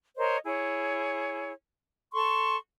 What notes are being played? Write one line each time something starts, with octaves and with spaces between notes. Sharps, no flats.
A#4 C5 C#5 D#5
E4 G#4 C#5
A4 C6 C#6